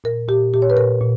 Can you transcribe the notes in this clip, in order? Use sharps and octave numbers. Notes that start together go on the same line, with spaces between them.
A#2 A#4
A#2 G4
A#2 G4
C#5
B4
A#2 A#4
A#2